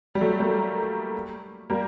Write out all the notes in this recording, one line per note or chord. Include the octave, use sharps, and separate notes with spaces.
G3
F#3 A3
G3 A#3
G3 A#3